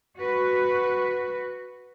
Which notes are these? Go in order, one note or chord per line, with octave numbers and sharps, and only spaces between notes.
F#4 B4